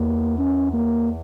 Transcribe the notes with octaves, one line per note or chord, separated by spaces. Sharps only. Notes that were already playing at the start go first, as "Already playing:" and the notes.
Already playing: E2 A#3
C#4
A#3